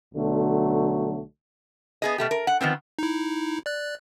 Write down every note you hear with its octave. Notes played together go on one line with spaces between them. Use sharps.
B1 D3 F#3 A3
B3 G#4 D#5
B2 A3 G4
A#4
F#5
D#3 F3 B3 C4
D#4 E4
D5 F#6